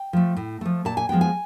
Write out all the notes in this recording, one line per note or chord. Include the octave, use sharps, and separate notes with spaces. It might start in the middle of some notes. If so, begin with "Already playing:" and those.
Already playing: G5
F3 A3
A2
F3 A3
A#2 A5
G#5
F3 G#3 B3 G5
G#5